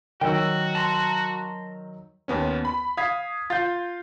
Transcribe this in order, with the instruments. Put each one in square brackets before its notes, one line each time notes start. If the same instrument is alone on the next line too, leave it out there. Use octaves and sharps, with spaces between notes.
[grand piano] D#3 F#3 E6 [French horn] F#4 [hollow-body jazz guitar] G5
[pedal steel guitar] A5 A#5 C6
[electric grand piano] D#2 B3 C#4
B5
[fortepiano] F5 [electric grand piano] D#6 G#6 B6
[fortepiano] F4 [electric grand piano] G6 A6